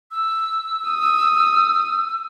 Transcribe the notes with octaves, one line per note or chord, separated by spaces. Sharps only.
E6
D#6